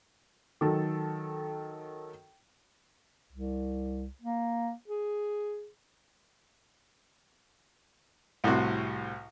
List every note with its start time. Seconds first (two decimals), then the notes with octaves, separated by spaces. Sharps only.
0.61 D#3 F#3 A4
3.32 C2
4.22 A#3
4.88 G#4
8.44 C2 A2 C3 F#4